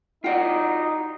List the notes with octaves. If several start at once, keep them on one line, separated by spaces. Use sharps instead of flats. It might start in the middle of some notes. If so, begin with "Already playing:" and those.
D#4 F4 F#4 D5 F#5 G5